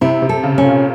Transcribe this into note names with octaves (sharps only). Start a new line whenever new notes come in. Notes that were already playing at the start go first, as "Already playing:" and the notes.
C3 E4
C3
A4
C#3
C#4
A#2